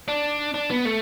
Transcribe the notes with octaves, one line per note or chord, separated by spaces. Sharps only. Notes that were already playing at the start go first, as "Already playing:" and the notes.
D4
D4
B3
A3